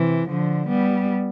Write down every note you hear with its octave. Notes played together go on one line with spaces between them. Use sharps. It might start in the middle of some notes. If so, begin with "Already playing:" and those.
Already playing: C3 E3
D3 F3
G3 B3